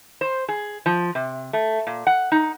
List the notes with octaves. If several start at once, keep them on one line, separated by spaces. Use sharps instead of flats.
C5
G#4
F3
C3
A3
A#2
F#5
D#4